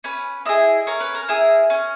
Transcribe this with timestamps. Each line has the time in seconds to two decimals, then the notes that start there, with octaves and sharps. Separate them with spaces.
0.04 C#4 B4
0.45 E4 G#4 D#5
0.87 C#4 A#4
1.00 B4
1.15 A#4
1.29 E4 G#4
1.70 C#4